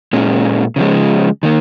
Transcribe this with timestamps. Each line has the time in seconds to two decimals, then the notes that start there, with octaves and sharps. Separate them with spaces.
0.13 A#2 G#3 C#4
0.76 C#3 F3 G#3
1.43 D#3 A#3